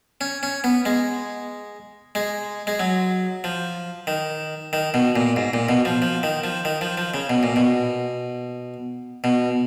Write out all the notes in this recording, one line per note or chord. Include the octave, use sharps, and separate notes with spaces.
C#4
C#4
B3
G#3
G#3
G#3
F#3
F3
D#3
D#3
B2
A#2
G#2
A#2
B2
F3
F3
D#3
F3
D#3
F3
F3
C#3
B2
A#2
B2
B2